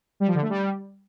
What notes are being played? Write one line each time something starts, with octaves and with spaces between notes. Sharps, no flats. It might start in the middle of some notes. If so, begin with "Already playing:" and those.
G3
F3
D3
A3
G3